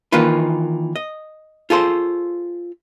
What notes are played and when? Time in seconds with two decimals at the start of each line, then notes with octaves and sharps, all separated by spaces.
0.12 D#3 E3 A#3 D#4 F4 B4
0.96 D#5
1.70 F4 G#4 A4 C5